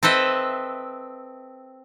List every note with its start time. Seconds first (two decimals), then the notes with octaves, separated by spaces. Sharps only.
0.03 C4 A4 B4 D#5 E5